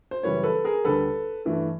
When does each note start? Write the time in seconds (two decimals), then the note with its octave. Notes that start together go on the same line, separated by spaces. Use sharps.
0.11 C5
0.23 F#2 C#3 E3 G3 B4 C#5
0.43 A4 B4
0.65 G#4 A#4
0.85 D2 D3 G3 A4 B4
1.45 G2 E3 A3